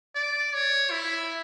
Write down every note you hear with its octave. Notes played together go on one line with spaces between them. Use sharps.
D5
C#5
E4